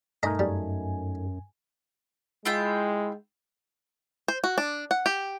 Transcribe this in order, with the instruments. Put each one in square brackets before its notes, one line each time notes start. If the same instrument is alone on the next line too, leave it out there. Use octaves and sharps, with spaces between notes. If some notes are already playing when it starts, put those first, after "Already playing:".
[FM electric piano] G2 G#5 [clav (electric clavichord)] A3 D#4 A#4 [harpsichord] D#5 A#5 B5
[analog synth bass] F#2 [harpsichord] G3
[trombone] G#3 [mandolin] E4 F4 G5
[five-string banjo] C5
F#4
D4
F#5
G4